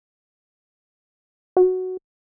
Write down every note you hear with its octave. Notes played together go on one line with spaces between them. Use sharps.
F#4